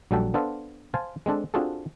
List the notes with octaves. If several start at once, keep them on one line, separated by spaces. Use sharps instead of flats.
A#1 F#3 G3 F#4 A4 G5
B3 D4 A4 C5 F5
C5 F5 G#5 A5
G#3 C4 D4 A4
C4 D4 F4 F#4 G#4 A4